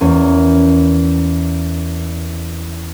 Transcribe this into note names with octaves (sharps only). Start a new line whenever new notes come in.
E2 A#3 C#4